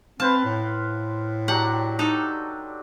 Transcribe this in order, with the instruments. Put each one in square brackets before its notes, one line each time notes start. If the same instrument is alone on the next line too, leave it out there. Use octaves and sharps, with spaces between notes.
[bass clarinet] C4 [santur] B4 C5 F5 [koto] A5
[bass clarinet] A2
[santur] F#3 D4 G4 [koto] F#5
[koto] D#4 A4